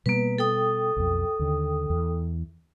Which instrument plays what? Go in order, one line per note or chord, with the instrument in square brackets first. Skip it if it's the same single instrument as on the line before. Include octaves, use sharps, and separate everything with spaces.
[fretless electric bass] B2 G3 B3 [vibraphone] A#3 B4
[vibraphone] A4 G5 D#6
[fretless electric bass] B1 F2
D#2 D3
E2